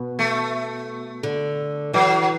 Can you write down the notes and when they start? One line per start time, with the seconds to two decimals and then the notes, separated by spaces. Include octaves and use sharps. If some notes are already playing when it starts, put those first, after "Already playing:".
Already playing: B2
0.19 A3
1.23 D3
1.94 E3 F#3